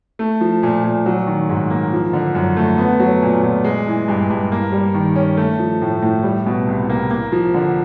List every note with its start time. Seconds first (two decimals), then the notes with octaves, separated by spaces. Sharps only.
0.19 A3
0.41 F3
0.63 A#2
0.84 A#2
1.06 F#3
1.27 D#3
1.49 G#2
1.70 A#3
1.93 F3
2.13 D3
2.35 F#2
2.57 A3
2.78 B3
3.00 F#3
3.22 A#2
3.43 A#2
3.64 G#3
3.87 E3
4.08 G2
4.30 G2
4.52 A#3
4.72 G3
4.94 D#3
5.16 C#4
5.37 A3
5.59 F3
5.82 A2
6.02 A2
6.24 G3
6.46 B2
6.67 C2
6.89 A#3
7.11 A#3
7.32 F3
7.54 D3